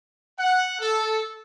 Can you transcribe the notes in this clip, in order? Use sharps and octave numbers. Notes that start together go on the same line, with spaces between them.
F#5
A4